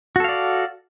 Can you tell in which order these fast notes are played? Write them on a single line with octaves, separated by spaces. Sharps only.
F#4 A4 F5 D5